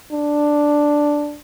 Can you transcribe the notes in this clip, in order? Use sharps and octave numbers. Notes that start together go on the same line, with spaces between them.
D4